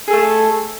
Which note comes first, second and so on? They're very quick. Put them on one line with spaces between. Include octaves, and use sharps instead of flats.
G#4 A4 A3